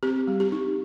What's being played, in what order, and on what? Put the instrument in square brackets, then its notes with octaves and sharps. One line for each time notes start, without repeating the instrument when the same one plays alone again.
[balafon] C4 G4
G3
G4
D#4